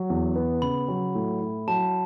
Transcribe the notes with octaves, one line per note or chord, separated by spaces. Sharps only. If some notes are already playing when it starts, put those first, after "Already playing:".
Already playing: F#3
E2
B3
C#3 B5
F#3
A2
E4
F#3 A5